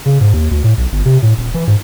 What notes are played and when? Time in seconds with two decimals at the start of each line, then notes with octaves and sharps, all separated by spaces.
0.06 C#3
0.21 G#2
0.33 D#2
0.51 D2
0.64 A2
0.78 B1
0.92 G1
1.05 C3
1.22 A2
1.38 D#1
1.54 E3
1.67 G#2